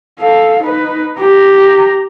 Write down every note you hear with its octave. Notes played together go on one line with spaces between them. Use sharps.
A4 F5
D#4 B4
G4 A#5